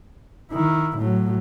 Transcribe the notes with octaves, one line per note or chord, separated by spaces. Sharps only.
D#3 E4
A2 F#3